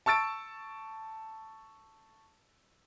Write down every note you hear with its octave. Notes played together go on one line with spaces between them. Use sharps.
A5 C#6 E6 A6 D7